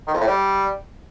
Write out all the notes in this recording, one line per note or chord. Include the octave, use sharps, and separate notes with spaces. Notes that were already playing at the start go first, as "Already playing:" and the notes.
D#3
F2
A2
G3